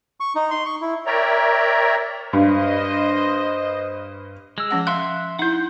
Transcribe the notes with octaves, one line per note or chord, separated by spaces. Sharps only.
C#6
D#4
C6
C#6
E4
A#4 C#5 D5 E5 G5 A#5
G2 C5 D#5
G#3 E6
F3 C#4 F#5
E5 F5 C6 F#6
D#4 E4 F#5 G6